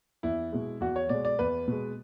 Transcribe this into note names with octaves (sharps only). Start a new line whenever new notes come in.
E2 E4
B2 G#3
E2 F#4
C#5
B2 G#3 D5
D5
E2 B4
B2 G#3